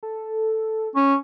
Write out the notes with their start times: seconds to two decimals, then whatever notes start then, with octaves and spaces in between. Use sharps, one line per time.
0.03 A4
0.96 C#4